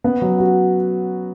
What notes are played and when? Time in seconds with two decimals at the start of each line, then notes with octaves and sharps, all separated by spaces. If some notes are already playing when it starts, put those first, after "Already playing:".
0.04 B3
0.22 F#3
0.39 F#4